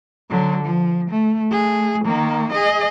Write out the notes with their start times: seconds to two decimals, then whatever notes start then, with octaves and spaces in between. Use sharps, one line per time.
0.30 D3 F#3
0.64 F3
1.10 A3
1.51 A3 G#4
2.05 D#3 A#3
2.52 G#4 D#5